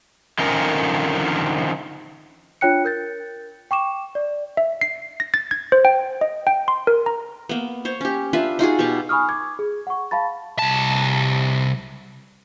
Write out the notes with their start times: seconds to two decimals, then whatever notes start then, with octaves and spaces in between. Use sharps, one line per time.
0.39 D3 D#3 F3 C4 C#4 A#4
2.61 D4 F4 C#5 G5 F#6 C#7
2.85 A#4 G6 A6
3.71 G5 C#6 D6 E7
4.15 D5
4.57 E5
4.81 C7
5.20 A#6
5.34 A6
5.51 G#6
5.72 C5
5.85 G5
6.21 D#5
6.47 G5
6.68 C6
6.87 A#4
7.06 A#5
7.49 A#3 B3
7.85 C5 C#5
8.01 C#4 G4
8.33 D4 F4 B4 E5
8.59 D#4 F4 F#4 G#4
8.79 B2 G4 F5 C#6
9.09 G#5 B5 C#6 D#6 F6
9.29 D6 G#6
9.59 G#4
9.87 F#5 C#6
10.11 F5 A5 B5 A6
10.59 C2 A5